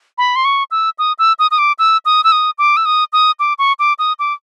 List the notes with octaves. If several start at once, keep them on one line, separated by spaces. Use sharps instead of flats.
B5
C6
C#6
E6
D#6
E6
D#6
D#6
D6
E6
D#6
E6
D#6
D6
E6
D#6
D#6
D6
C#6
D6
D#6
D6